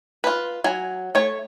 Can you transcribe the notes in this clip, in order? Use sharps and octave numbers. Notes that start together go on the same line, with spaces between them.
F4 B4
F#3 G#5
A3 C#5